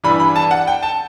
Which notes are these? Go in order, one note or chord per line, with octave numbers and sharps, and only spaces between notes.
G2 E3 G3 D4 B5
B5
A5
F#5
G5
A5